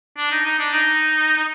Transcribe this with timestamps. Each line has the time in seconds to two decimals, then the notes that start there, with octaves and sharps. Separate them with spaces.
0.17 D4
0.31 D#4
0.45 D#4
0.59 D4
0.73 D#4
1.37 D#4